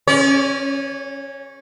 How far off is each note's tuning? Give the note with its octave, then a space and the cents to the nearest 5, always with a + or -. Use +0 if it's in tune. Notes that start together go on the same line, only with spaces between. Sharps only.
C#4 -15 C#5 +40